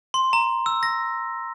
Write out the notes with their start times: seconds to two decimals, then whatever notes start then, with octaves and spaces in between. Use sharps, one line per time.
0.14 C6
0.33 A#5
0.66 E6
0.83 A#6